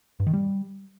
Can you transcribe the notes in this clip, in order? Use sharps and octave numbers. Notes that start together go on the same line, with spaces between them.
G2
D#3
G3